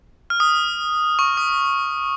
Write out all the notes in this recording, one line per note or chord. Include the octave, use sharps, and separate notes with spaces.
F6
D#6
C#6
D#6